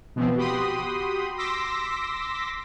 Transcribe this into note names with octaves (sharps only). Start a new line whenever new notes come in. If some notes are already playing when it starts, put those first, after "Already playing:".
B2 E3 F3 B3 C4
F#4 G4 G5 B5 C6 D#6
C6 D6 E6 A#6 B6